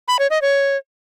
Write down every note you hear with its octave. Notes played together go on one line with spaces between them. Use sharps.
B5
C#5
D#5
C#5